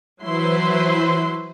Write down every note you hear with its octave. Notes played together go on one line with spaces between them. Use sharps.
E3 F#3 E4 B4 C5 C6